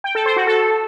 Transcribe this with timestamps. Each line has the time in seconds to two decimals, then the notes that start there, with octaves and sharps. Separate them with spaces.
0.04 G5
0.15 A4
0.26 C5
0.36 F#4
0.47 A4